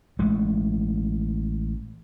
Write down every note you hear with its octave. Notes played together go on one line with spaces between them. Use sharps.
A1 G#3 A3